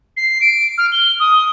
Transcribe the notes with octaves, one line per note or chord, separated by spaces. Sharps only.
C7
D7
F6
G7
D#6